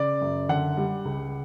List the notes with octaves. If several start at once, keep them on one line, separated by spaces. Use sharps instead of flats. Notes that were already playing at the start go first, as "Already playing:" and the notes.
Already playing: C#3 D5
F#2
D3 F#5
G3
C#2